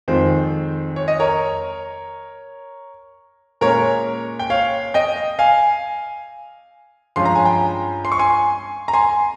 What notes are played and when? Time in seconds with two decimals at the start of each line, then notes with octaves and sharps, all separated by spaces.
0.08 F2 D#3 G#3 C4 F4 C5
0.96 C#5
1.08 D#5
1.20 A#4 C#5
3.61 A#2 G#3 C#4 A#4 C#5
4.39 G5
4.50 C#5 F5
4.94 D#5 G5
5.39 F5 G#5
7.16 G2 F3 G#3 C#4 F4 C6
7.25 A#5
7.35 G#5
7.45 G5 A#5
8.05 C6
8.12 C#6
8.19 G#5 C6
8.88 A#5
8.93 G#5 C6